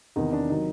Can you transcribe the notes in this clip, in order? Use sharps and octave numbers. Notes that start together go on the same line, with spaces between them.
E2 C3 D#3 D#4
D4
C3 D#3 F#3 D#4